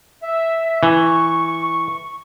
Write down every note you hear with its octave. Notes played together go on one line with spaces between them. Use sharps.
E5
E3 C#6